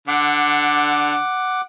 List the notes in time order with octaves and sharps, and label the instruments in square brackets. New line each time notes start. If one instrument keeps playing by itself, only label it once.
[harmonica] D3 [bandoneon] F#5 D6